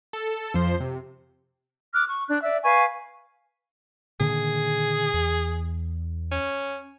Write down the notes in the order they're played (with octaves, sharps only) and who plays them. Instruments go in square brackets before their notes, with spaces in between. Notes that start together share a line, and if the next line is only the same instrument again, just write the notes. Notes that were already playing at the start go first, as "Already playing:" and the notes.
[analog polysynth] A4
F2 F3 C5
C3
[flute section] D6 F6 F#6
C#6
D4 F#6
D5 E5
B4 F5 G#5 C#6
[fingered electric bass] A#2 D3 D#3 [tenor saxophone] G#4
[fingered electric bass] E2
[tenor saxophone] C#4